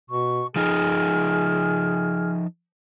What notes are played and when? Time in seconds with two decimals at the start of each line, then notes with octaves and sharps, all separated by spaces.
0.10 B2 C#6
0.56 F3 D#4 G#4 F6